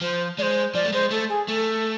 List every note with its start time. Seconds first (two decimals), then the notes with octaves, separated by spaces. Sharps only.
0.01 F3 C5
0.38 G#3 C5 D5
0.75 F3 D5
0.84 A3
0.92 G#3 C5
1.11 A3 A4
1.29 G#4
1.48 A3 A4